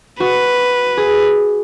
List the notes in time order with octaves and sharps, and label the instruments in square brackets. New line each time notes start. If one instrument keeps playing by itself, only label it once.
[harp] F#4 [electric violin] B4
[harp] G#4